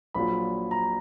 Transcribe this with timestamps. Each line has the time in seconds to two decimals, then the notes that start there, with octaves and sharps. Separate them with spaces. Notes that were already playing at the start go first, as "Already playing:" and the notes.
0.14 A#1 A#2 F#3 B5
0.71 A#5